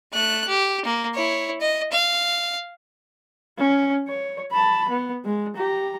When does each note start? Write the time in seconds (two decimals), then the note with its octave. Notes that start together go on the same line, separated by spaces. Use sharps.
0.13 A3 F#6
0.48 G4
0.85 A#3
1.14 E4 C#5
1.61 D#5
1.92 F5
3.59 C#4
4.08 C#5
4.52 A5 B5
4.89 B3
5.25 G#3
5.56 G4 A#5